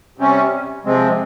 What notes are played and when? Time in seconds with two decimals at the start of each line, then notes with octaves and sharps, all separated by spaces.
0.18 C3 G3 C#4
0.85 C3 F3 G#3 C4